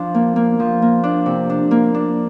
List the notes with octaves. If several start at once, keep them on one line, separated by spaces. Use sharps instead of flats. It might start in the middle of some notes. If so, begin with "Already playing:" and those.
Already playing: F3 D4
A#3
A#3
F3
A#3
D4
C3
D4
A#3
D4